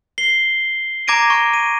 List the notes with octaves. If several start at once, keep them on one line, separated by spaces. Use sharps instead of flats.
C7 G7
A#5 D6 G#6 A#6 D7 D#7
C#6 D6
D#7